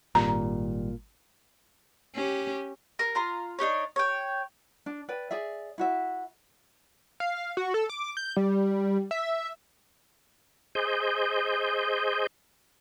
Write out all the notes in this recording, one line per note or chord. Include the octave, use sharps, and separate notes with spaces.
G#1 A#2 G3 A#5
C#4 G4
A#4
F4 A#5 C6
D4 D#4 G4 C#5
C#5 G5
D4
B4 D5 G5
G#4 D5 E5
E4 F#4 E5
F5
F#4
A4
D6
G6
G3
E5
G#4 C5 D#5 G6